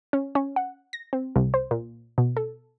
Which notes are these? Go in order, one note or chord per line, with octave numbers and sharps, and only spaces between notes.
C#4
C#4
F#5
A#6
C4
C2
C5
A#2
B2
A4